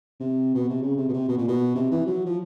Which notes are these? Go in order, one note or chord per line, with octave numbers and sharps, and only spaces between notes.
C3
B2
C3
C#3
C3
B2
C3
B2
A#2
B2
C3
E3
F#3
F3